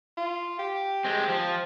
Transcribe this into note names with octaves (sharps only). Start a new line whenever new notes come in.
F4
G4
G#3 C4
F3